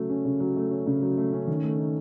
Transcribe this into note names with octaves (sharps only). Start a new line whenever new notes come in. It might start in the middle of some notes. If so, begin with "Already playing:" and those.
Already playing: C#3 F#3 A3
C#4
C#3
F#3
A3
C#4
C#3
F#3
A3
C#4
D#3
A3
D#4